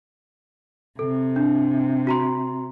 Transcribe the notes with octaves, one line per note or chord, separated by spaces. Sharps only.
C3 A4
D4
F#4 A#5 C6